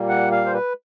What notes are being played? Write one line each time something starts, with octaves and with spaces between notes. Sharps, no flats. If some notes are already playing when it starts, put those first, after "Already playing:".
Already playing: A#2 G3 A#3
F#5
F5
C5
B4